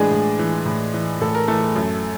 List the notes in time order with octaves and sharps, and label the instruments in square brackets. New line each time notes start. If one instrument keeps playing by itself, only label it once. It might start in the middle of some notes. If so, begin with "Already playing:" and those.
Already playing: [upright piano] A2 E3 G#3 D4 G#4 D5
A2
E3
A2
E3
A2 A4
A#4
E3 A3 A4
F#2